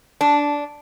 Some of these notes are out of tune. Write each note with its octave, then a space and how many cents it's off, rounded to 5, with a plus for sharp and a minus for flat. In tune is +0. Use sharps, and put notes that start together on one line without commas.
D4 -10